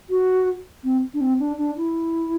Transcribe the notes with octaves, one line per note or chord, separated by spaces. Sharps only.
F#4
C4
D4
C4
D4
D4
E4